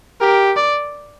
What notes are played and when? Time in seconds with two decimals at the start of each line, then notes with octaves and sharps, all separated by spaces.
0.21 G4 A#4
0.57 D5